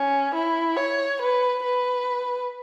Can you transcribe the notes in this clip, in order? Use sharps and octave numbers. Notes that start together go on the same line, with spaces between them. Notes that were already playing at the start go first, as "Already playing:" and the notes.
Already playing: C#4
E4
C#5
B4
B4